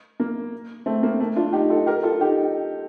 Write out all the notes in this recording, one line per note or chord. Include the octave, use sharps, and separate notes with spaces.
A#3
A3 C4
A#3
A3
D4 F4
D#4 G4
F4 A4
G4 A#4
F4 A4
D#4 G4